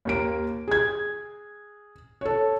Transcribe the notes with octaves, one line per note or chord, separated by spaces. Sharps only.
D#2 A#3 D7
G#4 G#6
A4 C#5